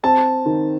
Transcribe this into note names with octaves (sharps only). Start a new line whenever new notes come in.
C4 A5
D#3